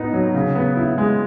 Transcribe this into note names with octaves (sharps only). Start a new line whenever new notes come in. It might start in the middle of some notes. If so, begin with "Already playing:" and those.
Already playing: A2 B3 D#4
F#3
C#3
B3
E4
G#3